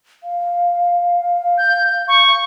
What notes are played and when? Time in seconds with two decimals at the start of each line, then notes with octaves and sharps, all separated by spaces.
0.24 F5
1.58 G6
2.08 C#6